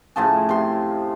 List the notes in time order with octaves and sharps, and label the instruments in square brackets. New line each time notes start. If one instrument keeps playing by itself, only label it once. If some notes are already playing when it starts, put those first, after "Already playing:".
[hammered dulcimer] A2 C#3 F3 A5
C3 C6